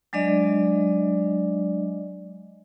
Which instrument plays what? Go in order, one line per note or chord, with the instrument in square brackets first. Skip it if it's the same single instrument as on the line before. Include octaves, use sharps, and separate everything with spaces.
[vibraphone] F#3 G#3 D4 D5 D#5